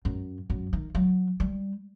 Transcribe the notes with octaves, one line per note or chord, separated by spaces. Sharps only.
F#2
F#2
D#3
F#3
G3